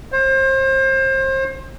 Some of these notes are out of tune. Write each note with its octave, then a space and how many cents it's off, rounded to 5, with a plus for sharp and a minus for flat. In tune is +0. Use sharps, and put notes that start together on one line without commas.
C5 +30